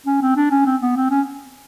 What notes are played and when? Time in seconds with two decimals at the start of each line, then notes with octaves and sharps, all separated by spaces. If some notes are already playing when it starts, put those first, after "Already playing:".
0.06 C#4
0.22 C4
0.36 D4
0.51 C#4
0.66 C4
0.82 B3
0.96 C4
1.11 C#4